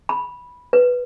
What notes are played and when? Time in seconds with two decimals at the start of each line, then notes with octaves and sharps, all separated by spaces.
0.09 B5
0.73 B4